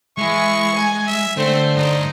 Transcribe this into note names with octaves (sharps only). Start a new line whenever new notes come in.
E3 G#3 E4 G#4 C#6
G#5 G#6
G3 E5
D3 A3 C4 C5
G2 D#4 D5